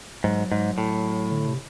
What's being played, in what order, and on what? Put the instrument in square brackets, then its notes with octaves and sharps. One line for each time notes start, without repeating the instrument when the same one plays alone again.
[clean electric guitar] G#2 [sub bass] F#3
[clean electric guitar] G#2
A2
[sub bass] D3
C3